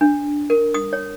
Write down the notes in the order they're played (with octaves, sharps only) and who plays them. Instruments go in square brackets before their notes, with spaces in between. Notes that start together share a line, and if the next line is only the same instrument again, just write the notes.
[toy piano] D4
A#4
D#6
C#5